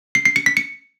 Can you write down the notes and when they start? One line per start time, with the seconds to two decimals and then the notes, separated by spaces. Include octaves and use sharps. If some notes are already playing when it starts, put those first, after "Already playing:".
0.15 C7
0.25 C7
0.36 C#7
0.46 B6
0.57 C#7